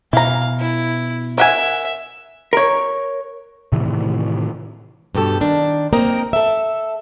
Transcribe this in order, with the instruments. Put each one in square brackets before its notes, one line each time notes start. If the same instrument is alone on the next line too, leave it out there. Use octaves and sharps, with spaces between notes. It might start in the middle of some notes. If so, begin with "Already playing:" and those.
[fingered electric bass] B2 B3 [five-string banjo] E3 A#5 [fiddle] F5
[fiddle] E4
[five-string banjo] A#4 F#5 G#5 [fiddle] E5
[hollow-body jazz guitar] A#4 C#5
[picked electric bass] A2 C3 D#3 E3
[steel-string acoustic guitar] G2 B2 G4 A4
D#3 D4
A#3 C4 D#4 A#4 D#5
A4 E5